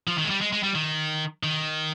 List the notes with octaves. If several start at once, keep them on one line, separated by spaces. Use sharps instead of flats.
F3
D#3
G#3
G3
G#3
G#3
G3
D#3
D#3